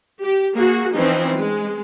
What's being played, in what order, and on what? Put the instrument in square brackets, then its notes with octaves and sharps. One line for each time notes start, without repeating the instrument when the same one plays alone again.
[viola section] G4
A#3 F#4 G#4
E3 F3 C4 C#4 D#4
G#3